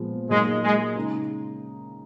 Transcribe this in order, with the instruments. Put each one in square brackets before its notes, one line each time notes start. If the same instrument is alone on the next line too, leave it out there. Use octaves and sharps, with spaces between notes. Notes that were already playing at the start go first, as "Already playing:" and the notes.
Already playing: [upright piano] A#2 F3 G#3 B3
[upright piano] A#2 F#3 A#3 D#4 [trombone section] G#3
[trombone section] G#3
[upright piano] C#3 G#3 D#4